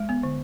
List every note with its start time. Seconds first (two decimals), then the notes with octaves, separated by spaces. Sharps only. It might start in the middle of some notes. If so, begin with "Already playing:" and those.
Already playing: G#3
0.09 B3
0.23 D3